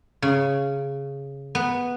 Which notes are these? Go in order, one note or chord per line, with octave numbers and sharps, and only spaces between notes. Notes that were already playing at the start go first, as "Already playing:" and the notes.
C#3
B3